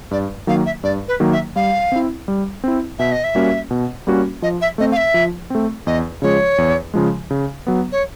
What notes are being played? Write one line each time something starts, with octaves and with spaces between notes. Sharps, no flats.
G2 D5
D#3 F#3 A#3 F5
E5
G2 D5
B4
D#3 F#3 A#3
E5
G3 F5
C4 E4
G3
C4 E4
B2 E5
D#5
E5
G3 A#3 C#4 F#4
B2
G3 A#3 C#4 F#4
F3 D#5
E5
A3 C4 D#5
F5
E5
F3
A3 C4
E2 D#5
C#3 F3 G#3 C#5
E2
C#3 F3 G#3
C#3
F#3 B3
C#5